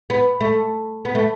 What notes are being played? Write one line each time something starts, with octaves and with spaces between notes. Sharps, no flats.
B3
A3
B3
A3